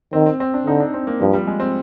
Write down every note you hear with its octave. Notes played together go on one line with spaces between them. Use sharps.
D#3 C4
C4
C4
D4
D3 D#4
D4
C4
A#3
G2 F3
G3
G#3
C4